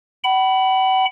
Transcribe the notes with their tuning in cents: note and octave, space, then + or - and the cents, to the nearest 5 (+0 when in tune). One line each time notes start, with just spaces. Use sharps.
F#5 +45 B5 +0